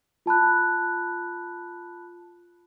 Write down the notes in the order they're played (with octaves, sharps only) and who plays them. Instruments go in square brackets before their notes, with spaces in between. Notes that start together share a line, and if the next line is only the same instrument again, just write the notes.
[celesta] F4 A5 B5 F#6